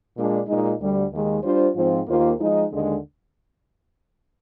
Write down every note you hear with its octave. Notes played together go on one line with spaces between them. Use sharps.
A#2 G#3 D4
A#2 G#3 D#4
D2 D3 G3
D#2 D#3 G#3
G3 D4 F4 C5
G#2 F3 C4 F4 C5
D#2 D#3 A#3 F4 C5
F3 G#3 D#4
D#2 D3 G#3